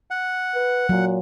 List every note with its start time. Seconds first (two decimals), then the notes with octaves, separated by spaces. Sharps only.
0.11 F#5
0.54 B4
0.89 A#2 F#3